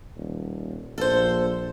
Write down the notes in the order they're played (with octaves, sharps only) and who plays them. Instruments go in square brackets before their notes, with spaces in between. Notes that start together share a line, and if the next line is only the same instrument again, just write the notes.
[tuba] D#1
[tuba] A#1 [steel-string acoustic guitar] A4 C5